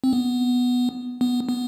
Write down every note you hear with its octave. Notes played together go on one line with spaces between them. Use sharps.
C4
B3
B3
B3